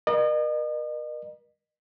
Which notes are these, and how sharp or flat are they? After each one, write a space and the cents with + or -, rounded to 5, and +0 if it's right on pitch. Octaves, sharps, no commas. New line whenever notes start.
A#4 +40 D#5 -40